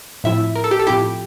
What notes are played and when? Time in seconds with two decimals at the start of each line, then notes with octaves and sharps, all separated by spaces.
0.24 A2 F3 C4 E4 E5
0.56 A#4
0.64 A4
0.71 G4
0.80 A4
0.87 A2 F3 C4 E4 G4